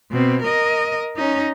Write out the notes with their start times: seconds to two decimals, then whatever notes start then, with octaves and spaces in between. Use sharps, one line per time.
0.11 B2 C4
0.42 A#4 D#5
1.17 C#4 D#4